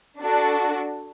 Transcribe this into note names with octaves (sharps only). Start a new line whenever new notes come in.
D4 F#4 A4